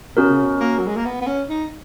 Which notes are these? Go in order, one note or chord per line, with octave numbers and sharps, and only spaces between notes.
B2 C#4 F#4 A#4
C#3
B2
A#3
F#3
G#3
A#3
B3
B3
C#4
D#4